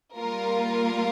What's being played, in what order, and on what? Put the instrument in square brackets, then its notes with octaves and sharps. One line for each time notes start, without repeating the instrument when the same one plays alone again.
[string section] G3 A#3 F4 A#4